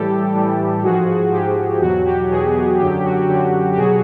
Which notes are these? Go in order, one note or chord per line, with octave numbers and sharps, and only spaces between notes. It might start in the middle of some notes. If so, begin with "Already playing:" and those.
Already playing: A2 E3 G3 G4 A4
A2 E3 G3
G#2 F3 F#4 G#4
F#4
G#2 F3 G4
E2 B2 F#3 F#4
G4
E2 B2 F#3 F#4 G#4
F#2 D3 F#3 G4
F#4
F#2 D3 F#3 G4
G4
B2 F#3 F#4 G#4